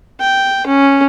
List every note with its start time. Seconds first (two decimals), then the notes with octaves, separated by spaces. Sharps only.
0.20 G5
0.67 C#4